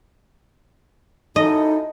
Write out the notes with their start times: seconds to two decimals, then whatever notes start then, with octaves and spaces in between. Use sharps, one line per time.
1.36 F#2 D#4 E4 A4 D#5